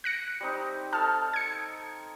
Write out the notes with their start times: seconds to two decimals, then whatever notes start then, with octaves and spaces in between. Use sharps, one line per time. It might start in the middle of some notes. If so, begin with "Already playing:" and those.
0.04 F#6 A#6 C#7
0.40 G3 C4 D#4
0.93 D#4 A4 A5 F6
1.33 G#6 C#7